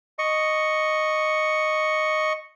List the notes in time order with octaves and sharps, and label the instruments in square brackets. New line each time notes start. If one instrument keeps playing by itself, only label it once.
[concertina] D#5 C#6